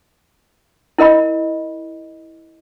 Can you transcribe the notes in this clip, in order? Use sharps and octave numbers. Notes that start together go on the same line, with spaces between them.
E4 A#4 D#5 B5